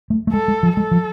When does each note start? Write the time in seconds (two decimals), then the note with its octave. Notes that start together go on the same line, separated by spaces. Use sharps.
0.10 A3
0.27 A3
0.32 G#3 A4
0.48 G#3
0.63 F3
0.77 G#3 A4
0.91 F3